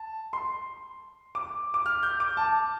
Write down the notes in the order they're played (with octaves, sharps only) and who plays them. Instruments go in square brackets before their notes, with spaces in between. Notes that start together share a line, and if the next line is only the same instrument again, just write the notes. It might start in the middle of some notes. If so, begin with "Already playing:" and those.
Already playing: [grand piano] A5
C6
D6
D6
F6
G6
D6
A5